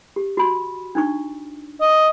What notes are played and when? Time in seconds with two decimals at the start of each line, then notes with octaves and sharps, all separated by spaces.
0.16 G4
0.37 F#4 B5 C6
0.95 D4 D#4 C#6
1.81 D#5